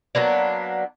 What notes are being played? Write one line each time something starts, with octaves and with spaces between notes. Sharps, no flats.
F#3 A#3 B3 D4